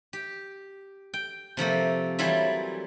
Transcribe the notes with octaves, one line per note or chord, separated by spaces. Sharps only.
G4
G5
C3 F3 A3 A#3
E3 F#3 G3 F4 E5